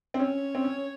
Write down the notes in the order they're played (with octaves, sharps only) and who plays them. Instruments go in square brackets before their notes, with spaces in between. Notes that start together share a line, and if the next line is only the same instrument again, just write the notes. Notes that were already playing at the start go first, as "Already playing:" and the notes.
[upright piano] C4
[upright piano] C#4 [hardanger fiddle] C#5
[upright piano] C4
C#4